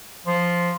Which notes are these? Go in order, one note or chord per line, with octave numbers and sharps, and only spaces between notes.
F3